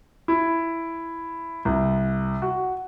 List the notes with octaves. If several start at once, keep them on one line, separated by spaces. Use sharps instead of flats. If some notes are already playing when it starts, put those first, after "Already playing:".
E4
C2
F#4